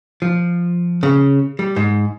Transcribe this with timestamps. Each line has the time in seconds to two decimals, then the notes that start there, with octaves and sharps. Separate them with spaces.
0.22 F3
1.03 C#3
1.59 G3
1.76 G#2